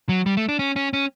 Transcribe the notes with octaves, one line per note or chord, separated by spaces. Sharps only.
F#3
G3
A3
D4
C#4
C#4
C#4